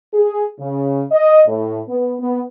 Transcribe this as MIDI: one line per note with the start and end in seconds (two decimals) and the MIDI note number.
0.14 0.44 68
0.60 1.03 49
1.12 1.41 75
1.48 1.81 45
1.88 2.14 59
2.20 2.42 59